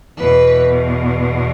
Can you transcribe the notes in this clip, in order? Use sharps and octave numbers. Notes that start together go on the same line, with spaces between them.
E2 B2 B4